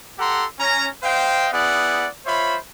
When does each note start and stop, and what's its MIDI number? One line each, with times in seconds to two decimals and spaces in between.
0.19 0.45 67
0.19 0.45 69
0.19 0.45 78
0.19 0.45 82
0.19 0.45 84
0.59 0.86 61
0.59 0.86 82
1.03 1.46 72
1.03 1.46 75
1.03 1.46 77
1.03 1.46 79
1.52 2.06 59
1.52 2.06 64
1.52 2.06 68
1.52 2.06 74
1.52 2.06 78
2.26 2.56 65
2.26 2.56 72
2.26 2.56 73
2.26 2.56 76
2.26 2.56 83